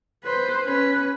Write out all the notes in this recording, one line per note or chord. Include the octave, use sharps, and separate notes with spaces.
B4 C5
C#4 B4